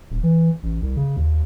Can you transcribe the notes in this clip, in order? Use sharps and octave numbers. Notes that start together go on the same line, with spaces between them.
D#1
E3
A1
C2
C#3
D#2